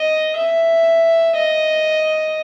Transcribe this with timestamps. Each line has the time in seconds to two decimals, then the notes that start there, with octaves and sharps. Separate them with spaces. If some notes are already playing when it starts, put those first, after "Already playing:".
Already playing: D#5
0.37 E5
1.36 D#5